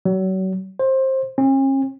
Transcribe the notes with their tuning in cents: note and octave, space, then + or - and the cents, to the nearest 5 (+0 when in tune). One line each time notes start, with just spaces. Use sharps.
F#3 +35
C5 +20
C#4 -45